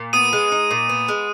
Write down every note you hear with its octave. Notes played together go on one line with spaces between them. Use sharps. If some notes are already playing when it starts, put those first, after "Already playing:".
Already playing: A#2
B3 D#6 D#7
G#3
D#4
A#2
B3
G#3